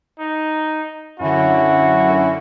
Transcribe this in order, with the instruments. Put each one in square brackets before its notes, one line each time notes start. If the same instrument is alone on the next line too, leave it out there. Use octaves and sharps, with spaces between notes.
[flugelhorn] D#4
[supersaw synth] F#2 D3 [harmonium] C#4 E4 [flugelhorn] F#4